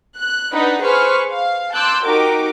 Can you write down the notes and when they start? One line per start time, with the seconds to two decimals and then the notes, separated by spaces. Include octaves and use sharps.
0.17 F#6
0.52 D4 D#4 B4 F#5
0.82 G#4 B4 C5 C#6 F6
1.29 F5
1.74 A5 C6 D6 E6 F#6 G6
2.04 D#4 F#4 G4 A#4 D6